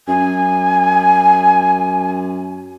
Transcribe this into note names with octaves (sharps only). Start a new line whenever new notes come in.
F#2 G#5